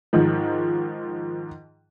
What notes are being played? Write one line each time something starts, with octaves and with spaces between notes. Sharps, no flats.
G#2 D#3 F3